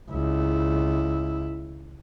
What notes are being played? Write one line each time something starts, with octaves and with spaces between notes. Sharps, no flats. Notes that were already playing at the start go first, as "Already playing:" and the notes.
C#2 E4